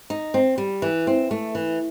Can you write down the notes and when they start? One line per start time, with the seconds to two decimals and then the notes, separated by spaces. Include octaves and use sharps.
0.10 D#4
0.34 C4
0.58 G3
0.82 E3
1.07 C4
1.31 A3
1.55 E3